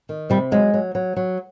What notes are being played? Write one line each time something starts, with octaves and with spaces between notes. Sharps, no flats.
D#3
C3 G3
F#3 G#3
F#3
F#3
F#3